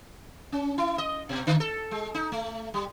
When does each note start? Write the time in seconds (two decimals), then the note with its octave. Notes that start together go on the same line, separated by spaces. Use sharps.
0.52 C#4
0.78 E4
0.98 D#5
1.29 B2
1.47 D3
1.60 A4
1.91 G#3
2.14 D#4
2.32 A3
2.74 G3